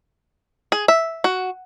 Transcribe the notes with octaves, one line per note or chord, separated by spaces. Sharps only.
G#4
E5
F#4